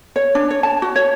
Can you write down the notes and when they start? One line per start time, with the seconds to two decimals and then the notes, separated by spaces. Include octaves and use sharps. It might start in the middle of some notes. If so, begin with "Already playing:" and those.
0.16 C#5
0.35 D4
0.50 C#5
0.63 A5
0.82 F#4
0.95 C#5